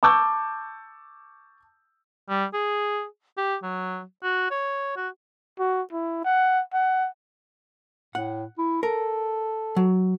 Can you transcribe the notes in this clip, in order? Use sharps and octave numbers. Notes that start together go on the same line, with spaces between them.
A5 C#6 D6 E6 G6
G3
G#4
G4
F#3
F#4
C#5
F#4
F#4
E4
F#5
F#5
A2 F#5
E4
A4 A#4
F#3